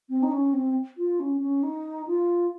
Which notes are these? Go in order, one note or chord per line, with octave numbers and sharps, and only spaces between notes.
C4
D#4
C#4
C4
F4
C#4
C#4
D#4
F4